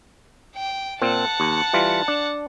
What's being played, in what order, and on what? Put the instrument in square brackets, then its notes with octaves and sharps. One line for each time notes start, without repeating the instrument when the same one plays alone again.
[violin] G5
[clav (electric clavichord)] A#2 C4 [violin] F#5 A5
[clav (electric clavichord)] D#2
E3 G3 F4
D4